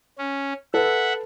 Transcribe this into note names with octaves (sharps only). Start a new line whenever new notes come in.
C#4
A4 B4 E5 F#5